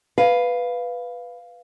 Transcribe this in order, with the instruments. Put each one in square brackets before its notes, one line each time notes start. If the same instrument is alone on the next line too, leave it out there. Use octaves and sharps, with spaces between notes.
[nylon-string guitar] B4 [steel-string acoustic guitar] F5